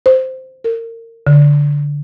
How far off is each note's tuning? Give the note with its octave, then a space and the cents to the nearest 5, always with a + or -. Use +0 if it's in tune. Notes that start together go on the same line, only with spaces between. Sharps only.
C5 -5
A#4 -30
D3 -15